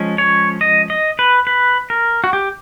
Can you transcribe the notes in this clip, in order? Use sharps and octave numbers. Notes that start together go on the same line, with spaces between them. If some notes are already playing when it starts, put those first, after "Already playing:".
Already playing: F3 G#3 C#4
C#5
D#5
D#5
B4
B4
A#4
F#4
G4